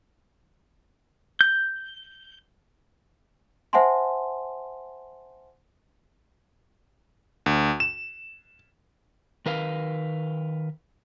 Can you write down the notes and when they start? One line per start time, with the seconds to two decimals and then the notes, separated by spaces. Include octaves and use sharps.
1.41 G6
3.73 C5 E5 F#5 G#5 A5 C6
7.46 D2
7.80 E7
9.46 D#3 A#4 B4 F5